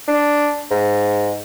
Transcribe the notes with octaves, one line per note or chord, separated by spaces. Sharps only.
D4
G#2